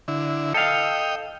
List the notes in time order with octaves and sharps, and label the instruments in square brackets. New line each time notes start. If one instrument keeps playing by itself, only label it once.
[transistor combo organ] D3 E4
[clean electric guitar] A4 F5 [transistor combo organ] D#5 G5